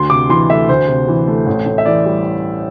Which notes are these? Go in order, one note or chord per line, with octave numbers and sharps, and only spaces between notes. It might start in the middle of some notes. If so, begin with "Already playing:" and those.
Already playing: D2 C6
C3 D6
E3 C6
A3 E5
D2 C5
C3
E3
A3
A1
A2
E5
E3 D5
G3